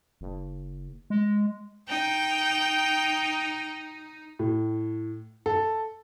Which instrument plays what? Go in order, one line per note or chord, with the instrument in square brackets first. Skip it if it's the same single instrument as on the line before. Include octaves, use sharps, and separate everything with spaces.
[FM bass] F#1
G#3
[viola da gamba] D#4 [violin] G5
[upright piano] A2
A4